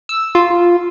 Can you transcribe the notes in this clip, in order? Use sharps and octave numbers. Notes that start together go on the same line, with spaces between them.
E6
F4